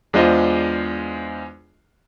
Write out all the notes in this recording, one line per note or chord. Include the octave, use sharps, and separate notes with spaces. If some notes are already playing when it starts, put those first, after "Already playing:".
E2 G#3 D4 F4 C5 D#5